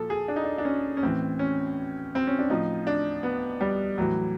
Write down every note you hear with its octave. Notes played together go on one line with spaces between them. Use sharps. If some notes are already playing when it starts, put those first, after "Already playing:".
Already playing: A#2 F3 A4
G#4
D4
D#4
D4
D4
C#4
C#4
A2 E3 C4
C#4
C4
C#4
D4
A2 F3 D#4
D4
B3
G3
A2 E3 F#3